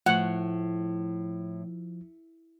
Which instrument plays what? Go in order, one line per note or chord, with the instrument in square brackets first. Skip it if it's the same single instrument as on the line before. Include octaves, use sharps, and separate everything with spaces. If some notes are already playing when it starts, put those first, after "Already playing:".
[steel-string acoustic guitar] A2 [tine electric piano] F3 [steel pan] F#5